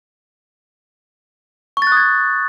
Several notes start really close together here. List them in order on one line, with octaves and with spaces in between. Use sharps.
C#6 A6 F#6 D#6 G#6